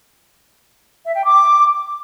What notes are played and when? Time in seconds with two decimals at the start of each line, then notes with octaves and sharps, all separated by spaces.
1.04 E5
1.14 G5
1.24 D6